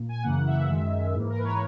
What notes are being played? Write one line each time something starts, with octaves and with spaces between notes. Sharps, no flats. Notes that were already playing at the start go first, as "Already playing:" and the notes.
Already playing: A#2
G#5
F#2 C#3 E3 A#3 F#5
E5
F#2 D#3 G#3
G#2 E3 A#3
A#4
B4
C#5